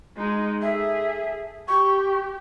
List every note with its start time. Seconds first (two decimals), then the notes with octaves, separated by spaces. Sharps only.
0.17 G#3 D#4
0.62 G#4 A4 E5
1.68 G4 C#6